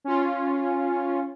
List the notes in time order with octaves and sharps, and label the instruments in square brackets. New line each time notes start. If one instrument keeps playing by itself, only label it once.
[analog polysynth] C#4 F4